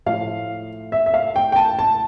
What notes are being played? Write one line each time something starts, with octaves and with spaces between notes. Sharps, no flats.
A2 F3 F5
E5
E5
F5
G5
G5
A5
A5